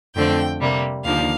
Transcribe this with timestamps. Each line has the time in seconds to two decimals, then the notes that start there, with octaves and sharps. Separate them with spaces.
0.15 F2 D3 A3 C4 G5
0.60 C3 G3 A#3
1.04 D#2 D3 F3 A#3 F5